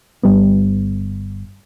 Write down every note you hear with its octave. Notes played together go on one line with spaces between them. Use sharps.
G1 G3 B3